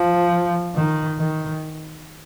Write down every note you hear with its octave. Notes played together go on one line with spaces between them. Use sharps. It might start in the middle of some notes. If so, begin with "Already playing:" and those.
Already playing: F3
D#3
D#3